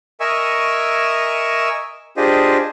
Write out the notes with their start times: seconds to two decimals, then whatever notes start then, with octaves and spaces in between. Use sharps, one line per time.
0.20 A#4 D#5 E5 G#5 C#6 E6
2.17 D4 F4 G4 G#4 C5 D#5